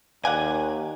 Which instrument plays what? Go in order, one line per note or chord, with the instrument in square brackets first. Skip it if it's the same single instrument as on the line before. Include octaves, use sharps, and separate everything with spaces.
[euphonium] D#2 [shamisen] D5 F5 F#5 [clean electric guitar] G#5